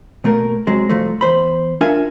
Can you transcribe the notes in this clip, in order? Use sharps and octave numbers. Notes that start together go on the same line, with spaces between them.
B2 A3 A#3 A#4
C3 F#3 G#3
C2 F3 A3
E2 C5 B5
D4 F4 A#4 E5 G#5